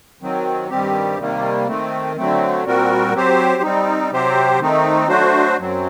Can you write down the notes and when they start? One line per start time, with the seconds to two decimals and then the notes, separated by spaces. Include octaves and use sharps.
0.21 D#3 F#3 C4
0.70 G2 D#3 G3 C4 G4
1.19 C3 D#3 G3 A#3
1.67 D#3 A3 C4
2.16 D3 F#3 A3 C4
2.65 A#2 G3 C4 F#4 A#4
3.13 F#3 C4 G4 C5
3.62 G3 C4 D#4
4.11 C3 F#3 C4 G4 C5
4.60 D#3 A3 C4 D#4
5.08 F#3 A3 D4 F#4 C5
5.58 F#2 F#3 C4